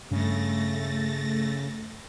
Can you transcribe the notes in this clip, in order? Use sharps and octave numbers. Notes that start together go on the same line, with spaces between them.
G2 C#3 A3 A6 A#6